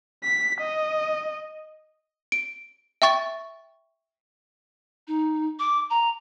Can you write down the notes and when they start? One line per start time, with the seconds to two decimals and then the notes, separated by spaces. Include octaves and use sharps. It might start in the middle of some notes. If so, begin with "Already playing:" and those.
0.24 B6
0.61 D#5
2.32 D7
3.02 E5 G5 C#6 A6
5.08 D#4
5.59 D6
5.90 A#5